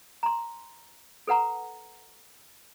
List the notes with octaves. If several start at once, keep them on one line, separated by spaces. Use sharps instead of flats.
A#5 C6
A4 B4 F#5 A#5